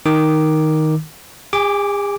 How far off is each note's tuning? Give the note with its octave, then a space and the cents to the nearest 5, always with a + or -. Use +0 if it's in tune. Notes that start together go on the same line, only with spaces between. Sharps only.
D#3 +5 D6 +0
G#4 -45 G#5 +0 D6 -5